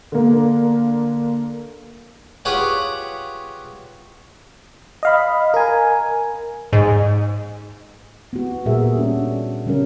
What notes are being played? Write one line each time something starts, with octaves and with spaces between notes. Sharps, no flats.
D3 A#3
F4 G4 G#4 B4 C#5 F#5
D#5 F5 B5
A#4 G#5
G#2
B3 F#4
A#2 G3 F#4 G#4 A#4 E5
C#4 D4 F#4
C#3 G3 C#4 A#4